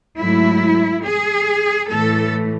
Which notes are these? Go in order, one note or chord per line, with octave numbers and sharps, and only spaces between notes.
G#2 F#3 A3 E4
G#4
A2 E3 A3 A4